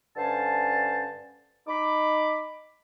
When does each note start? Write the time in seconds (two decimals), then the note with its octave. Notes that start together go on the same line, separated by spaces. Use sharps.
0.16 G2 D3 C#4 C5 A5
1.68 D#4 B5 D6